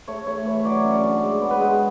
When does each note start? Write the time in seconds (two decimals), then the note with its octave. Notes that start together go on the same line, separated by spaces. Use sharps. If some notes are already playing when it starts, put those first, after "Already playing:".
0.08 A3 C#5
0.27 A3 C#5
0.46 E3 C#5
0.65 F#3 D5
0.84 C#4
0.94 D5
1.03 D3
1.22 G#3
1.41 B3
1.51 B4
1.60 G#3